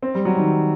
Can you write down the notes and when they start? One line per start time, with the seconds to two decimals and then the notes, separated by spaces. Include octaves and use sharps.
0.03 C4
0.15 G3
0.25 F#3
0.37 D#3